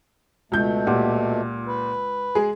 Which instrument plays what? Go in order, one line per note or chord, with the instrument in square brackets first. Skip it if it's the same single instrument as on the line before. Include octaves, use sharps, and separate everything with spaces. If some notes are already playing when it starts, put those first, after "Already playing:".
[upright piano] C#2 G6 [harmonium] B2 A3
[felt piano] A#2 G4 F#5
[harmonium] B4
[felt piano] G#3 [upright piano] G#4